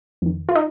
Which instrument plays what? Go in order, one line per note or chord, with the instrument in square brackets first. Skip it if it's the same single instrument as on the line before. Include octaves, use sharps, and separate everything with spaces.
[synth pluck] F2 D#3
F4
D#4